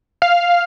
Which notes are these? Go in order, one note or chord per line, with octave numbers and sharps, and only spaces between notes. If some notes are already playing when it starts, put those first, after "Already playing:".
F5